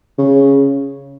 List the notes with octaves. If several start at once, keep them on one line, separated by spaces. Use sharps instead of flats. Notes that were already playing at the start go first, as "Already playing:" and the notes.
C#3